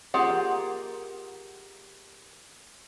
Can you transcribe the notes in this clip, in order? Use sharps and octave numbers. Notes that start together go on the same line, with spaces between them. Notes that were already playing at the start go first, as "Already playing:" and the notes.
A#3 F4 G4 G#4 F#5